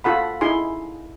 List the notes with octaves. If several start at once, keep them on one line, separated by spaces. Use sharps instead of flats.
F4 A4 F#5 B5
D#4 E4 G#4 G#5 C6